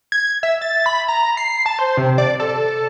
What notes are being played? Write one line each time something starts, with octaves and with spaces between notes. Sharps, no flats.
G#6
E5
A6
B5
A#5
C7
A5
C5
C3
D5
A4